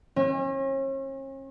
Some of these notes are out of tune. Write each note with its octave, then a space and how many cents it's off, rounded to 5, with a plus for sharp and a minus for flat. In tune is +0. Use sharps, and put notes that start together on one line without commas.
C#4 -40